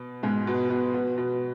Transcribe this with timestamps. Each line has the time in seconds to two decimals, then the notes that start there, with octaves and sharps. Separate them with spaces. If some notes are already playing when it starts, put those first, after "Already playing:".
Already playing: B2 B3
0.23 G#2 G#3
0.46 B2 B3
0.70 B2 B3
0.94 B2 B3
1.16 B2 B3